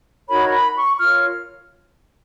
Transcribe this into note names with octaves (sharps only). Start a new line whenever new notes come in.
D#4 F#4 A#4 C#5 B5
B5
C#6
F4 A#4 C#5 F6